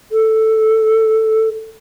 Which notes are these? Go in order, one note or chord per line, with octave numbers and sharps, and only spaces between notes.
A4